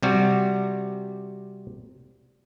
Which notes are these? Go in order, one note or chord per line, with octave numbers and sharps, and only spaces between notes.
C3 G3 F#4